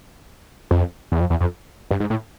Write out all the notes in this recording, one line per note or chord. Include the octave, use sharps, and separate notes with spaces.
F2
E2
F2
E2
F2
G2
G#2
A2